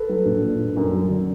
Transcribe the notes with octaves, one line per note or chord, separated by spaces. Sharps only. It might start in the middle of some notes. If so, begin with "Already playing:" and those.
Already playing: A4 B4
F#3
A#1
A#2
A#1
F#2
F#3
D3